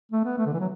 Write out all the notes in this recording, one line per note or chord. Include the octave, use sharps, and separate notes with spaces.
A3
B3
A3
D3
E3
F#3